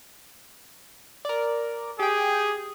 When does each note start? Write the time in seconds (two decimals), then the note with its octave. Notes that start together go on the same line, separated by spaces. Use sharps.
1.25 A#4 D5
1.99 G4 G#4 G5